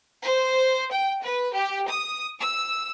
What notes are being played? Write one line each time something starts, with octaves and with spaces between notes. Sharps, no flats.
C5
G5
B4
G4
D#6
E6